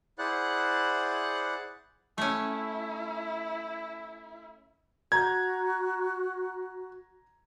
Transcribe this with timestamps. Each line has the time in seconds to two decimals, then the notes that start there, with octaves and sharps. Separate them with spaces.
0.19 E4 G#4 C5 D5 F#5 F#6
2.18 A3 C#4 E4
5.12 F#4 A#5 G6 G#6